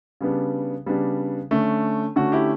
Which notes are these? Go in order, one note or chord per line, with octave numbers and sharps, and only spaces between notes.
C#3 G3 B3 D4
C#3 G3 B3 D4
D3 A3 C#4
D3 A3 C#4 F#4
E4 G4